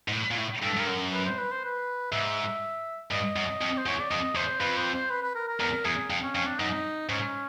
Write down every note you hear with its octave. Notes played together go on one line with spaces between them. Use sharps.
G#2
A2
A#2
A2
G2 A4
G2 A#4
F#2
B4
C5
B4
C5
B4
G#2 E5
G2 D#5
F#2
F2
C5
E2 C#5
D5
F2 D#5
E2 C5
F2 B4
C5
C5
B4
B4
A#4
A#4
E2 A#4
E2 G#4
F2
C#4
F2 C#4
D4
F#2 D#4
G#2 C#4